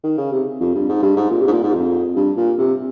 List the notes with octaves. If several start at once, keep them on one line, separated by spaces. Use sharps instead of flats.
D#3
C#3
C3
F2
G2
G#2
G2
G#2
A#2
C3
G#2
A#2
G#2
F2
G2
A#2
C3